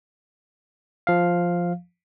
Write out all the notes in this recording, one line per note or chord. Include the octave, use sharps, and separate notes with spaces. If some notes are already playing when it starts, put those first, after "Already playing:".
F3 F5